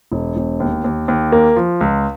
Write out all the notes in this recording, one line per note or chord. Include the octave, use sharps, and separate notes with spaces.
E1
E1
D#2
D#2
D#2
A#3
F3
C#2